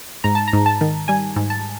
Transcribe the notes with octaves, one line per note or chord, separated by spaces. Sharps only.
G#2 A#5
A5
A#5
G#2
A5
D#3
G3 G#5
G#2
A5